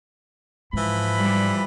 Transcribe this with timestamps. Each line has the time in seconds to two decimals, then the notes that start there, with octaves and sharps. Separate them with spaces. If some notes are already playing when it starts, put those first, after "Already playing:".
0.73 G#2 E3 F3 B5
1.19 G3